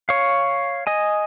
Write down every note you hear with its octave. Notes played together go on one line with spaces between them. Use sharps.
C#5 F5
D#5 G#5